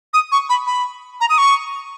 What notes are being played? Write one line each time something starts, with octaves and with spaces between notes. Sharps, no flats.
D#6
C#6
B5
B5
A#5
D#6
C#6